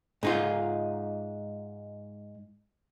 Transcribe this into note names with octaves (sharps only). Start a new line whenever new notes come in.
G#2 D#4 F4